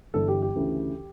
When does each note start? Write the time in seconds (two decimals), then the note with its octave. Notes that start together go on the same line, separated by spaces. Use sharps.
0.14 G1 G2 E3 A4
0.28 G4
0.42 G4
0.56 D2 C#3 E3